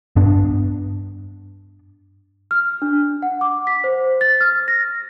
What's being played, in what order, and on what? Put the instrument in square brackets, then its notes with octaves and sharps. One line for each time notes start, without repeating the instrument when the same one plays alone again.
[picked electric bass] G2 B3 D4
[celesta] F6
D4
F#5
D6
B6
C5
A6
F6
A#6